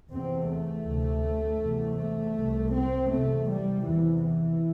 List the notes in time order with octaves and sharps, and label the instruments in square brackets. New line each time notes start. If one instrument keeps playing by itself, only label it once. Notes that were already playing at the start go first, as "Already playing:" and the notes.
[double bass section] E2 C3 C4
A3
D2 C3
E2 C3
A3
C2 C3
C4
E2 C3 A3
G3
E2 C3 E3
E3